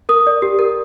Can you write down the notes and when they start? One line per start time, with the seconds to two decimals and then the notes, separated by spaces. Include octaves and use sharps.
0.09 A#4 D#6
0.27 D5
0.42 G4
0.59 A#4